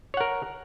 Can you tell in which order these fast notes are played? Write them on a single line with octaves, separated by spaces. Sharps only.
C#5 F#5 A#4